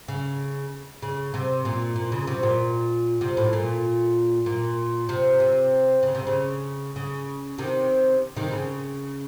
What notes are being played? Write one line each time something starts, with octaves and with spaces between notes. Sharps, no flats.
C#3
C#3
C3
A#2
A#2
C#3
C3
A#2
C3
A2
A#2
A#2
C3
C3
C#3
C3
C#3
C#3
C3 D#3
C3 D#3
C#3